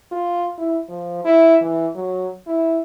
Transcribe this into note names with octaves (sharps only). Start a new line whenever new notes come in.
F4
E4
F3
E4
E3
F#3
E4